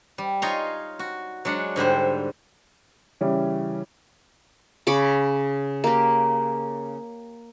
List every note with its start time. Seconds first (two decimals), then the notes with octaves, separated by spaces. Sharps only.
0.18 G3
0.42 D#4 F4 C#5 G#5 A#5 C6
0.99 F#4
1.45 F#3 G#3 D4 F#5
1.76 G#2 D3 G3 C5
3.21 C#3 E3 G3 C#4
4.87 C#3 C#5 B5 D6
5.84 A#3 G4